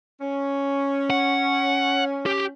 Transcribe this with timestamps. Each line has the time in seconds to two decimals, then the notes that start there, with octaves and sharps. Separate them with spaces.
0.21 C#4
1.10 F#5
2.26 G4